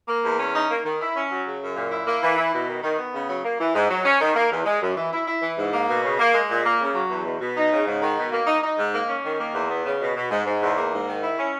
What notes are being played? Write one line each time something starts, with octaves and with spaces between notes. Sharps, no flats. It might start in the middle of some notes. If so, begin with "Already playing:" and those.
A#3
E2
C#4
D#4
A#3
D#3
E4
C#4
F#3
C#3
F#2
A#2
E4
A#3
E3
E4
B2
D#3
D#3
B3
C#3
F#3
A#3
E3
G#2
F#3
C#4
D#3
A#3
E2
G#3
F#2
E3
E4
E4
E3
G#2
A#3
B2
C#3
A#3
G#3
A#2
A#3
C#3
F#3
E2
B2
B2
D#4
C#3
G#2
D#3
B2
A#3
D#4
D#4
G#2
A#3
C#4
D#3
A#3
E2
B3
C#3
B2
B2
G#2
G#2
E2
A#3
G#2
D#3
E4
C#4